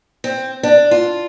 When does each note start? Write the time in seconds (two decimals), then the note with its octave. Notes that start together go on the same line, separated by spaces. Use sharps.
0.24 C4
0.63 D4
0.91 F4